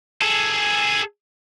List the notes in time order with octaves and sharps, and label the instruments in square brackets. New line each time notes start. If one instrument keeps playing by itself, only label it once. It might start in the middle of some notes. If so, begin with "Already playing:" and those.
[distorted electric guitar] G#4 A4